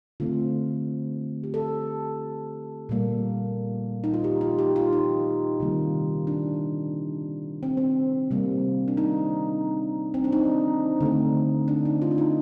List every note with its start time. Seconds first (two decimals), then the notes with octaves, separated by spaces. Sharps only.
0.20 D3 A3 C4 F4
1.44 G4
1.54 A4
2.89 A#2 G3 A#3
4.04 D#4
4.14 F4
4.24 G4
4.41 F4
4.59 G4
4.76 F4
4.93 D#4
5.60 C3 D#3 G3 A#3
6.27 D4
7.63 C4
7.77 C4
8.31 C3 G3 A#3
8.88 D4
8.97 D#4
10.14 C4
10.24 D4
10.32 D#4
11.01 D3 A3 C4
11.68 D4
11.85 D#4
12.02 F4
12.11 D4
12.18 D#4